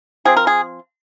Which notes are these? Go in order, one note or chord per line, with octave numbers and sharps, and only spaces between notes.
F3 C4 G#4
A#4
G#4